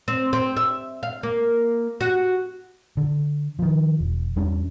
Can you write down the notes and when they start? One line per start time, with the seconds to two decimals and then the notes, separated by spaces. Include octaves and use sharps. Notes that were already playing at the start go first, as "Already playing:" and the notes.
0.08 C4
0.33 C4
0.57 E5
1.03 F5
1.23 A#3
2.01 F#4
2.97 D3
3.59 D#3 F3
4.00 E1
4.36 E2 G3 C#4 D4